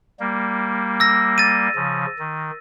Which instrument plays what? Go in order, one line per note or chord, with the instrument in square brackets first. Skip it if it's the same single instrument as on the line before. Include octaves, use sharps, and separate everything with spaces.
[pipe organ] G3 A#3
[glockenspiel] E6 A#6
A6 D#7
[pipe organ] C#3 F3
D#3